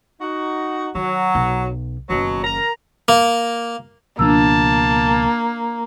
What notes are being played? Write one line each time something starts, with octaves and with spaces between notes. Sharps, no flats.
D#4 F#4
D#3 F#3
B1
F#1 B2 D#3 F#3
A#4 A#5
A#3
C#2 B2 F3 A#3 D4 A5 E6